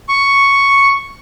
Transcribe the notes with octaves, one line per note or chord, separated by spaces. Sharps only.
C#6